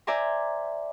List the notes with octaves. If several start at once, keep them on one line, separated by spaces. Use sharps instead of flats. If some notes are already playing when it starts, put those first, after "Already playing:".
C5 D5 E5 G#5 A#5 C6